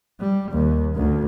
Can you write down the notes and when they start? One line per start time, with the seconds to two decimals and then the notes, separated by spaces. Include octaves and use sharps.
0.21 G3
0.52 D#2
0.95 D2